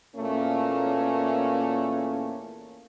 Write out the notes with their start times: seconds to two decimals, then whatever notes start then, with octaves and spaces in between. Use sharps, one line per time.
0.16 E2 A#2 A3 A#3 C#4